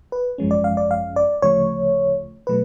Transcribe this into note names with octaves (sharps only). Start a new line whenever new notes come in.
B4
G#1 F#2 F3 G#3 C#4
D5
F5
D5
F5
D5
D2 C#3 F3 A3 C#5
B2 F#3 A3 B4